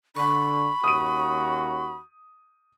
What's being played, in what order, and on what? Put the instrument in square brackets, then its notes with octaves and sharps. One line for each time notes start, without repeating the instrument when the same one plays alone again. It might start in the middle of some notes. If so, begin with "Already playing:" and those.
[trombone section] D3 [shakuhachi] B5 [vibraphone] C#6
[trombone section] D#2 C#4 F#4 [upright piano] D#6 D#7